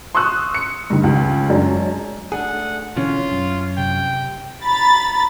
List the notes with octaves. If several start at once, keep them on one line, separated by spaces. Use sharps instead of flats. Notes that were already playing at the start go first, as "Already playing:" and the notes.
C6 C#6 D#6 E6 F#6
C#7
G2 D#3
C#2
F#2 G#3 C#4 D4
A3 D4 G#4 F#5
B2 D3 E3 C#4 F4
F#2
C3 G5
A#5 B5 A6